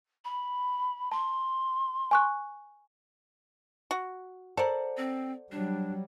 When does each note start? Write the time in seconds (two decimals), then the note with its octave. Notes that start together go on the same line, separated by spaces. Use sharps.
0.25 B5
1.12 A5 C6
2.11 G#5 C#6 F#6
3.91 F#4
4.57 A4 A#4 C5 D5 F#5
4.97 C4
5.52 F#3 G3 D4